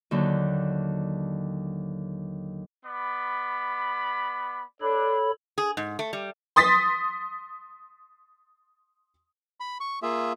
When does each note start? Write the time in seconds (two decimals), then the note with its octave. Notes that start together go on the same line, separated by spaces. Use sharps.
0.11 D#2 D3 F#3
2.85 B3 D5 B5
4.82 D4 A4 C#5 B5
5.58 G#4
5.77 G#2
5.99 A3
6.13 G3
6.56 C6 D#6 A6 B6
9.60 B5
9.80 C#6
10.02 A#3 F4 G#4 E5